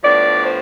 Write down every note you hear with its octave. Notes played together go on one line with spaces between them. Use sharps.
A2 F3 B3 D4 D5
C5